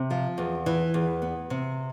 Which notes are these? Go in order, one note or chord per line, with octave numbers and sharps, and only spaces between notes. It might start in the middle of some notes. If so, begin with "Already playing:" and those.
Already playing: C3
F3
E2
E3
E2
B3
C3